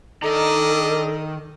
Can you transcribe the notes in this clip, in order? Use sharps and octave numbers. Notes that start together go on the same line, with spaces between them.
D#3 D4 A4 D5 D#5 A#5